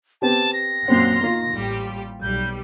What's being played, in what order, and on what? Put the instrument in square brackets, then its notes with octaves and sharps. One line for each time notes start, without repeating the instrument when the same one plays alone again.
[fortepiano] B3 C4 G4 [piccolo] A5
[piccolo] A#6
[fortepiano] F#2 A#2 C4 [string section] F#5 C6 F6
[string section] D#3 [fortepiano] A#3 F4
[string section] A1 G3 G4
[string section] B1 G3 [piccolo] G6